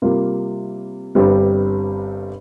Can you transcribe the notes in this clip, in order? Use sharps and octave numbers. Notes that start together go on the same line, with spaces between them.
C3 G3 A#3 F4
G1 G2 G3 C4 G4